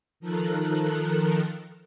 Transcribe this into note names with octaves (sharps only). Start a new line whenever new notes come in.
D#3 F3 A4 A#4 F#6